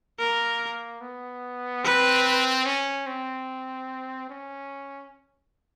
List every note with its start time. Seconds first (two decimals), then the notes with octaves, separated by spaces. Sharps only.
0.19 A#3 A#4
1.01 B3
1.84 C4 B4
2.65 C#4
3.07 C4
4.30 C#4